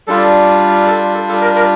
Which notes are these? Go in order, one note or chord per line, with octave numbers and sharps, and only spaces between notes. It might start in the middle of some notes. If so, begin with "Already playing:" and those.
G3 D4 F4 A4
A4
A4
A4
A#4
A#4